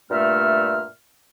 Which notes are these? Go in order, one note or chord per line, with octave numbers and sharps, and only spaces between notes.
G2 A#2 A3 E5 F6